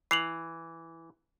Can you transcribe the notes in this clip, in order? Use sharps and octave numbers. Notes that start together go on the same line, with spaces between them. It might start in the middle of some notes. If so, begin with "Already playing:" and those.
E3 C7 F7 F#7